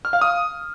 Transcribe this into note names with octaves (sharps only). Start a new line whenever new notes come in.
F6
F5
D#6